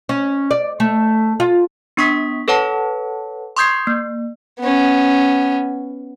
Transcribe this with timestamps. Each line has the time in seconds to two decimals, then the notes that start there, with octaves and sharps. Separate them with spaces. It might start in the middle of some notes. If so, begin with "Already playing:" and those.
0.09 C#4
0.51 D5
0.80 A3
1.40 F4
1.97 B3 D4 C#6 D#6 B6
2.48 A4 B4 C#5 F#5 A5
3.57 C6 C#6 D#6 G6 G#6 C7
3.87 A#3
4.60 B3 C#4